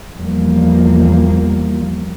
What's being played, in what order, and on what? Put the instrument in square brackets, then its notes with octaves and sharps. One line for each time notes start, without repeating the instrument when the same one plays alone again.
[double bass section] E2 F3 G3 A#3